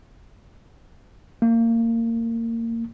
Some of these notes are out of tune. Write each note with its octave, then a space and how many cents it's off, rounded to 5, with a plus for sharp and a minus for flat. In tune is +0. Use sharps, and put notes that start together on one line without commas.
A#3 -25